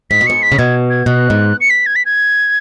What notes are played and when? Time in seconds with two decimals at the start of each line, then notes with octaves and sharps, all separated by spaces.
0.10 G#2 B6
0.21 B2
0.27 G#2 C#7
0.42 B6
0.52 C#3
0.58 B2 G#6
0.90 G#6
1.06 B2 F#6
1.30 G#2
1.61 C#7
1.70 B6
1.86 G#6
1.96 B6
2.05 G#6